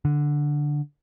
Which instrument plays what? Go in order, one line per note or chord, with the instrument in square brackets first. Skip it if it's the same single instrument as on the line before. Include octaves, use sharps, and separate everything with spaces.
[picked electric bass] D3